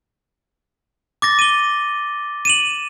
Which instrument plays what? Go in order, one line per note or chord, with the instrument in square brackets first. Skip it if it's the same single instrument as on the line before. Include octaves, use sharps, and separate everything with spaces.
[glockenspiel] D6 A6 A#6
D#7 G7
D#7 E7 F#7